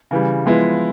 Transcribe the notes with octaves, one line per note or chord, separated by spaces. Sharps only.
C#3 E3 G3
F3 G#3 B3 E4